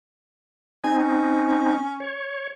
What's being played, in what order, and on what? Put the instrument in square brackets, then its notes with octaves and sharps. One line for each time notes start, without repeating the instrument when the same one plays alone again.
[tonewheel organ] C4 D#4 [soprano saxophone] G#5
[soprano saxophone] C#4
[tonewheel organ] C#5